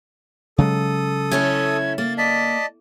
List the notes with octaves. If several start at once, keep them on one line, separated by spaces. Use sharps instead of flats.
C#3 F#3 G#3 A4 D#6
A3 C#4 E4 G#6
A#3 A6
D5 D#5 A5 B6